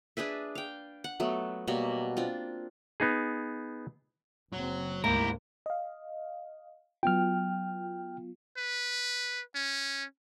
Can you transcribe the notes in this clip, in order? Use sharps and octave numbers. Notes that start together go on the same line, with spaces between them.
D4 G#4 B4 E5
F5 G5
F#5
F#3 A3 B3
B2 F#3 G3 A#3
C4 D4 F4
B3 D#4 G#4
F#1 F#3 C4
D2 G#2 A#3 E4 G4 A#4
D#5 F5
F#3 B3 F4 G5 F6
B4
C#4